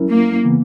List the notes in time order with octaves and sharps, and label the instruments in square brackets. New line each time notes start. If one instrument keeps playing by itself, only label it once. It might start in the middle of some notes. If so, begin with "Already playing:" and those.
Already playing: [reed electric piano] F#3 C#4 E4 A#4
[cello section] A#3
[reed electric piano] C#3 E3 B3